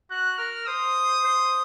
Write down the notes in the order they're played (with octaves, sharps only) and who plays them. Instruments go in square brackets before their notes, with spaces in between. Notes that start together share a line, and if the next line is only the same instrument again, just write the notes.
[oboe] F#4 [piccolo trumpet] F#6
[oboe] A#4 [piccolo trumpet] F6
[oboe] C5 [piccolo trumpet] D#6
[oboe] C5